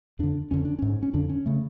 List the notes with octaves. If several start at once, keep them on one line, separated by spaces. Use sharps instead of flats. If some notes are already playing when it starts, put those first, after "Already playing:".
F2 D3 D4
F2 D3 C#4
D4
G#2 C#4
C#4
F2 D3 D4
C#4
C#3 A3